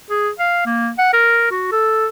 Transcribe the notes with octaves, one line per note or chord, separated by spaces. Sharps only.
G#4
F5
A#3
F#5
A#4
F#4
A4